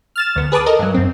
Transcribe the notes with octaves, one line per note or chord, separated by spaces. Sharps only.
F6 A6 E7
D2 B3
G#4 B4 A5 D6 D#6
A4 A#4 D#5
G2 F#3
F#2 C4